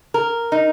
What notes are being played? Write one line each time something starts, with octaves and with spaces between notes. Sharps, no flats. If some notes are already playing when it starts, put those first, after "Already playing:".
A#4
D#4